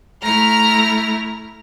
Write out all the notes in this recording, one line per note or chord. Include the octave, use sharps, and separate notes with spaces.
A3 E4 A#5 F6